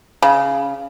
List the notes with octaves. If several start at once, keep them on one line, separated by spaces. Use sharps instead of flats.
C#3